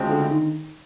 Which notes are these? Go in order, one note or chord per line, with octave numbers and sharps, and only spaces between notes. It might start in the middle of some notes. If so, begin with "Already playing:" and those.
Already playing: D2 C#3 F3 G#3 C4
D3
D#3